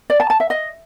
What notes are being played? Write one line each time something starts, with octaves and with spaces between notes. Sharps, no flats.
D5
A5
A5
E5
D#5